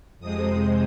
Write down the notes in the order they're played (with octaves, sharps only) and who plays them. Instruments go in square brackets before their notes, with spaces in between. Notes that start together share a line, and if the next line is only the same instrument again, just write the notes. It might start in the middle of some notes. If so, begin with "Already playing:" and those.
[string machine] F2 C3 G#3 C4 D#6